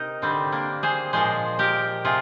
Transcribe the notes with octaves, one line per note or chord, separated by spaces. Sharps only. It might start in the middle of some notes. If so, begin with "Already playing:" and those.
Already playing: C3 D#4 A#4
D3 G3 C4
A#3 D4
G#4 C5
A#2 F3 G#3 G#4 C5
G4 A#4
C3 F4 G#4